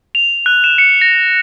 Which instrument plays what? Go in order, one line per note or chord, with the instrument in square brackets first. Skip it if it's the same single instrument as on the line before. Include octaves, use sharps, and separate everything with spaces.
[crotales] F7
F#6
E7
C#7
A#6